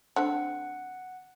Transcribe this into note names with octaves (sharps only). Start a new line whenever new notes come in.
D3 A3 C4 F#5